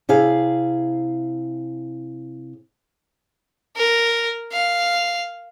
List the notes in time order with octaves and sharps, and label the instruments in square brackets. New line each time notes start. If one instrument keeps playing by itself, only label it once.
[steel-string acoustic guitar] C3 E4 G#4 F5
[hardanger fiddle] A#4
F5